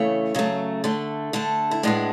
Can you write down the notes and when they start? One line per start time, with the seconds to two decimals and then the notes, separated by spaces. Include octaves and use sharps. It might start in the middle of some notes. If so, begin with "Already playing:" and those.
Already playing: C#3 E3 A3 C#5
0.35 C#3 F#3 A3
0.84 D3 A3
1.33 D3 A3 A4
1.71 E4
1.83 A2 G#3 B3 D4